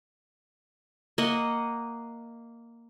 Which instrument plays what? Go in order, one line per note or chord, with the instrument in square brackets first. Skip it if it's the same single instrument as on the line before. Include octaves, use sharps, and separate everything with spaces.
[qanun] A#3 D#5 F#5